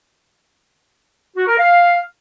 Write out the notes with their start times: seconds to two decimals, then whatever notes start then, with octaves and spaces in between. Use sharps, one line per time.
1.36 F#4
1.48 A#4
1.59 F5